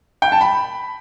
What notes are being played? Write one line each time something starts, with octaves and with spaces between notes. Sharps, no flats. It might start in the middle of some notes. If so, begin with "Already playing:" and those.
G5
A5
B5